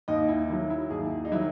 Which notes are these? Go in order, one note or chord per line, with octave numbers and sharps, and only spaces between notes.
D#2 D#5
E4
D#3 F#3 E4
E4
D#2 G#4
D#4
D#3 F#3 E4